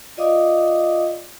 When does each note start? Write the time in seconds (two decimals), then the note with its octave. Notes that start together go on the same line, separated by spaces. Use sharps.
0.17 F4 D5 D#5 F5 D6 D#6